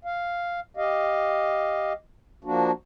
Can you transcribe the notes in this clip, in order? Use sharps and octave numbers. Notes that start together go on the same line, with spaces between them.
F5
G4 D#5 F5
F3 A#3 D4 F#4